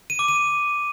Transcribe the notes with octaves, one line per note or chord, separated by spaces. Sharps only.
D#7
D6
D#7